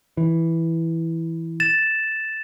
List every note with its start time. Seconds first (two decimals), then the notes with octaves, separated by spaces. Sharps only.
0.17 E3
1.60 A6 E7